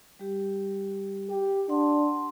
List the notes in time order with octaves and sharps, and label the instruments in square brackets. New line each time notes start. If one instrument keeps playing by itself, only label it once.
[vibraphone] G3 G4
[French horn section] G4
[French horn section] D4 [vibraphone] F#5 A5 C6